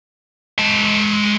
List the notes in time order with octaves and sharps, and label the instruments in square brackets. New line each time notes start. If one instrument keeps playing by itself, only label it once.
[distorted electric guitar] G#3 A5